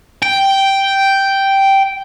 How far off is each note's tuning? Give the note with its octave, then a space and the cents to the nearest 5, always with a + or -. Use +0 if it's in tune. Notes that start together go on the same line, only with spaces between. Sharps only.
G5 -5